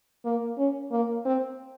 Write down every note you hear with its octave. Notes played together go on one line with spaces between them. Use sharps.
A#3
C#4
A#3
C4